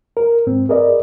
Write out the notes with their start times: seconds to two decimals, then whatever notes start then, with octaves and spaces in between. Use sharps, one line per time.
0.17 A#4
0.47 G#2 C4
0.69 G#4 A#4 B4 D5 D#5